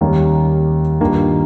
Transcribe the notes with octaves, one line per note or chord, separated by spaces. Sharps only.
D#2 D#3 G3 A#3 C#4
G2 D#3 G3 A#3 F4